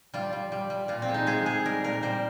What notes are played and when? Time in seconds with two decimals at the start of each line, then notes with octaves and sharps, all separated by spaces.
0.14 G3 F4
0.33 G3
0.52 G3
0.70 G3
0.88 A#2 F4
1.02 C4
1.09 G#3
1.14 D#4
1.27 G#3 G#4
1.45 G#3 G#4
1.65 G3 A#4
1.84 A#2 A#4
2.03 G3 C5